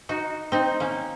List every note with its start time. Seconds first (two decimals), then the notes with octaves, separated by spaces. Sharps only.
0.09 D#4 F#4
0.52 C4 D#4
0.80 A#3 C#4